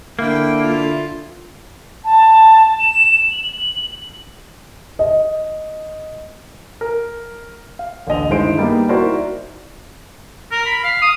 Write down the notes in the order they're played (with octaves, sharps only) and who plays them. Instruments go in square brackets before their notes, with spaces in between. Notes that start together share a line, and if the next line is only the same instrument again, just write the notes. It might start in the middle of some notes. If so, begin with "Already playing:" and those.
[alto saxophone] D3 [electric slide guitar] A#3 [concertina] E4 [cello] G5
[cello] F4
[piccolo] A5
E7
F#7
[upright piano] D#5
[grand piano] A#4
F5
A1 D2 D#5 F7
G2 D#3 G#3 E4 C5 D7
G3 A#3 B3 D#4
D#4 E4 F#4 A#4 C5 D5
[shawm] A#4
B5
F5
D#6